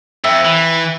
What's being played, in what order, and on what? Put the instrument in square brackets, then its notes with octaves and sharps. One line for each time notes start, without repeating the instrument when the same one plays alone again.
[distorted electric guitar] F2 [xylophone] E5 G5 E6
[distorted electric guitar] E3